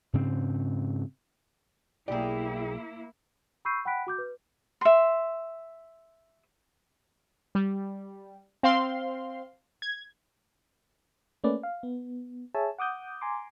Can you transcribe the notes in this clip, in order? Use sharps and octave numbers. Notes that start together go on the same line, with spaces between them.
G#2 C#3 C4
B1 A#3 E4 G4 G#4 D5
B5 C#6 E6 G6 C7 D#7
F#5 G5 B5 F#6 B6 D7
F#4 D6 G6
B4
E5 C6
G3
C4 F5 C6
G#6
A3 A#3 C#4 B4 D5
F5
B3
G#4 C#5 E5 G#5 A5 E6
F#5 D6 D#6 G6
G#5 A#5 C6 D6